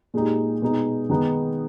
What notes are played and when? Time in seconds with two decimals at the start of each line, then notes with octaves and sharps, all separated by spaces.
0.14 A#2 G#3 D#4 G4
0.62 B2 G#3 D#4
1.10 D#3 G#3 B3 D#4